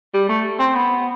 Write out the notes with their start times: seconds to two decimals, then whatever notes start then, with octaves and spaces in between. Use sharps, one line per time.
0.14 G3
0.29 A3
0.59 C4
0.75 B3